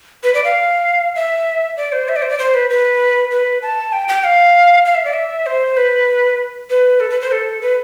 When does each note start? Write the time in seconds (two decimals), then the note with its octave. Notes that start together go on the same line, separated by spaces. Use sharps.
0.23 B4
0.34 D5
0.44 F5
1.16 E5
1.77 D5
1.92 C5
2.08 E5
2.16 D5
2.22 C5
2.30 D5
2.39 C5
2.54 B4
2.70 B4
3.31 B4
3.62 A5
3.92 G5
4.08 G5
4.24 F5
4.85 F5
4.95 E5
5.05 D5
5.14 E5
5.46 C5
5.77 B4
6.70 B4
7.00 A4
7.10 B4
7.21 C5
7.32 A4
7.62 B4